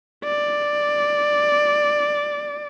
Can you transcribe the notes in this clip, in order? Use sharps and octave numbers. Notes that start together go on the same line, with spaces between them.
D5